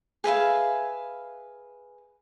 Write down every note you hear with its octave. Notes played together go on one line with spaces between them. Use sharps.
G#4 B4 E5 F5